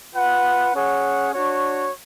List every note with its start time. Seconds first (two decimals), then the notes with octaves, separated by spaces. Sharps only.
0.13 F4 B4 F#5
0.73 C#4 G#4 C#5 F#5
1.32 D4 F#4 C#5